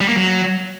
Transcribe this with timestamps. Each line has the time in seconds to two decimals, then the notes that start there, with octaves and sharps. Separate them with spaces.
0.01 G3
0.08 A#3
0.16 F#3